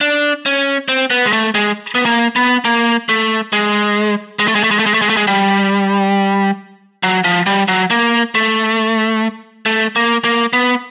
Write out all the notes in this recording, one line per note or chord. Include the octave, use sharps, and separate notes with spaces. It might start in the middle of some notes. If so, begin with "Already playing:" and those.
D4
C#4
C4
B3
G#3
A3
G#3
B3
A#3
B3
A#3
A3
G#3
G#3
A3
G#3
A3
G#3
A3
G#3
A3
G#3
A3
G#3
G3
F#3
F3
G3
F#3
A#3
A3
A3
A#3
A#3
B3